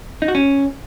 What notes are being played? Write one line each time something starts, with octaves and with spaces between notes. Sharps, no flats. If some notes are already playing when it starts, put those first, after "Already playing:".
D#4
F#4
C#4